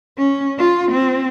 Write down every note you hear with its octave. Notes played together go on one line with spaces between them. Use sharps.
C#4
F4
C4